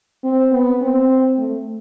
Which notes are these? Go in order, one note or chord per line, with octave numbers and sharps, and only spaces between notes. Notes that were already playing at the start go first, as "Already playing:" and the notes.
C4
B3
C4
A3